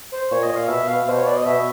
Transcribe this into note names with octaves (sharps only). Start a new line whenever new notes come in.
C5
A#2 C#5
D#5
A#2
F5
B2 E5
B2 F5
B2 C5
C#5
D5
D#5
B2 E5